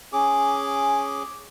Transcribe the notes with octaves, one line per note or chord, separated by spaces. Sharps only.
C#4 G#4 D6